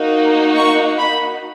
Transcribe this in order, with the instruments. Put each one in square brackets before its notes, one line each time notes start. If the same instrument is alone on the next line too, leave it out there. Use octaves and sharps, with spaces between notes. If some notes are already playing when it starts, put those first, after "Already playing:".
Already playing: [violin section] A#3 D#4 F#4
C#6
B5